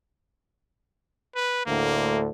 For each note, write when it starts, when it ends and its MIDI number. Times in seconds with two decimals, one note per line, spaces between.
1.35 1.65 71
1.66 2.29 38
1.66 2.29 45
1.66 2.29 50
1.66 2.21 58